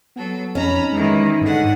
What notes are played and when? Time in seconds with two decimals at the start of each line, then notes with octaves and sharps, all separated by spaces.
0.16 F#3 B3 A4
0.55 F2 C#4 D#4 A#5 B5
0.92 D#3 E3 G#3
1.41 G#2 D3 F#5